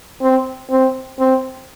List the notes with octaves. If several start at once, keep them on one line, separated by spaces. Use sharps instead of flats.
C4
C4
C4